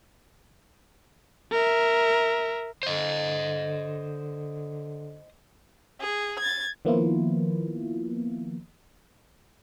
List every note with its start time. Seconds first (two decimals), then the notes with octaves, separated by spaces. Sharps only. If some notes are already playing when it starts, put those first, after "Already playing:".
1.52 A#4 E5
2.83 D3 C5 D#5
6.01 G#4
6.39 G#6 A6
6.85 D#3 F3 A#3 B3 E4 F4